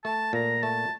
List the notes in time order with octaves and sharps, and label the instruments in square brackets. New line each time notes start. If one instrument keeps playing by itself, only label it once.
[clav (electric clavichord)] A3 [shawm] A5
[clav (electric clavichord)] A#2 [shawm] A#5
[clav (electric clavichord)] A3 [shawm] A5